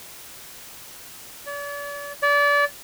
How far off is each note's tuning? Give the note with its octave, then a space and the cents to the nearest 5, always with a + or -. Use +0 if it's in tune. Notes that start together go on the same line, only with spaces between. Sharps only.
D5 -45
D5 -30